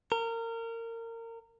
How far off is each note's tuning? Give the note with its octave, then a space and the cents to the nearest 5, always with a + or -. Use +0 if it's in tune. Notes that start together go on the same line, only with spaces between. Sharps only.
A#4 -25